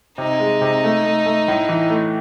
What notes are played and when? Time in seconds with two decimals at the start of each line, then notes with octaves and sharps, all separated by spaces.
0.18 C3 D#4
0.40 G#3
0.61 C3
0.84 A3
1.04 A3
1.26 A3
1.48 A2
1.69 E3
1.90 A3